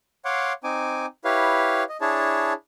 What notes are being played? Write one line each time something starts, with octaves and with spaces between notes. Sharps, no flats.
C#5 F5 F#5 C6 D6
C4 D#4 G#5 D6
E4 G4 B4 C#5 F5
D#5
D4 E4 G#4 C#5 A5